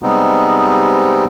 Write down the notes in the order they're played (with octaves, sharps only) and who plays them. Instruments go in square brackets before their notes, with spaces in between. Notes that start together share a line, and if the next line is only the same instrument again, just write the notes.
[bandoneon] C3 G3 G#3 B3 C4 D#4